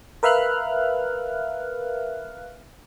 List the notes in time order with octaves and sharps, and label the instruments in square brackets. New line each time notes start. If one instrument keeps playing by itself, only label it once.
[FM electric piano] A#4 B4 E5 F5 F6 F#6